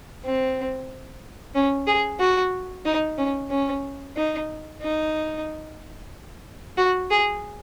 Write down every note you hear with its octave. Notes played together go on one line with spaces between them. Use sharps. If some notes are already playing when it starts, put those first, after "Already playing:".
C4
C#4
G#4
F#4
D#4
C#4
C#4
D#4
D#4
F#4
G#4